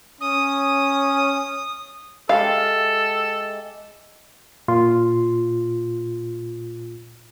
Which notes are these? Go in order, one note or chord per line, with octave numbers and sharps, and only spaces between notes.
C#4 D#6
G#3 G4 A4 E5 F5
A#2 F4 C6